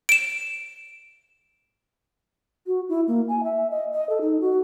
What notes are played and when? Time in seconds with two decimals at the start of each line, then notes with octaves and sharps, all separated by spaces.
0.09 D7 E7
2.67 F#4
2.89 E4
3.08 A#3
3.28 G#5
3.44 E5
3.71 D#5
3.92 D#5
4.09 A4
4.21 D#4
4.41 F#4